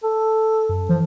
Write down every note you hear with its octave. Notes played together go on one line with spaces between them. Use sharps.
A4
F#2
E3 F3